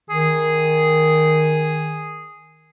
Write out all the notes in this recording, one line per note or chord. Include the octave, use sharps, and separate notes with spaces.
D#3 G#4